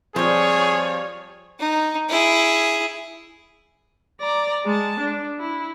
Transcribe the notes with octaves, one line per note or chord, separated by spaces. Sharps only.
F3 G3 C4 F4 G#4 C5 C#5
D#4
E4 G#4
D5 A#5
G#3 A5
D4
E4